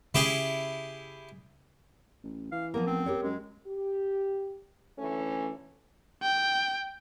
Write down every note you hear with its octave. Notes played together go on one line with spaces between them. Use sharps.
C#3 C#4 E4 G4 G#4
A1
E3 F5
F3 A#3 B3 A#4
A1 C4
G4 A#4 C#5
F#2 G#3
G4
D2 E3 A3 C#4
G5